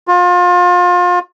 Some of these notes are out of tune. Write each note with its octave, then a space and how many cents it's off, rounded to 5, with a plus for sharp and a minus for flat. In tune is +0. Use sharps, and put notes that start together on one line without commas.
F4 +30